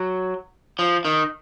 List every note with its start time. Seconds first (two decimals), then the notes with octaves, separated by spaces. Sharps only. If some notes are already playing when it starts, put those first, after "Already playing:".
Already playing: F#3
0.79 F3
1.05 D#3